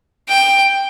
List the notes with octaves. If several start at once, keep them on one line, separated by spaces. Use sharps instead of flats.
G5